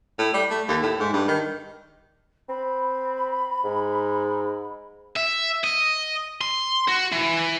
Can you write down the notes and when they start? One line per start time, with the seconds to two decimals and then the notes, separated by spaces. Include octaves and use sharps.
0.19 A2
0.33 G3
0.50 A3
0.68 D#2
0.82 A2
1.00 G#2
1.13 G2
1.28 D#3
2.49 C4 B5
3.64 G#2
5.17 E5
5.64 D#5
6.41 C6
6.88 F#4
7.12 E3